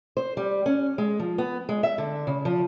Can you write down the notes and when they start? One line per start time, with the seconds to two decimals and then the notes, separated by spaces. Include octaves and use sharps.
0.17 C5
0.37 G3
0.66 C#4
0.98 G#3
1.20 F3
1.38 B3
1.69 G#3
1.83 E5
1.98 D3
2.27 C#3
2.45 F3